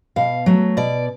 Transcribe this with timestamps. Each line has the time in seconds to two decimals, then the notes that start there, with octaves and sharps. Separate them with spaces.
0.16 B2 F5
0.46 F#3 A3
0.77 B2 D5